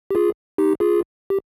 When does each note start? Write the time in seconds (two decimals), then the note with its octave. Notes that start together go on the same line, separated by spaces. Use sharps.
0.11 G4
0.15 F4 G#4
0.58 D#4 G4
0.80 F4 G#4
1.30 G4